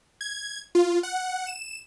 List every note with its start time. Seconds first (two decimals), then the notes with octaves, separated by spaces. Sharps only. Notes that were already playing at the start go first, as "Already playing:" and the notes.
0.21 G#6
0.75 F4
1.03 F#5
1.47 E7